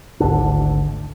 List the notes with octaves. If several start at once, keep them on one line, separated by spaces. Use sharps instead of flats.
G#1 D2 D3 D4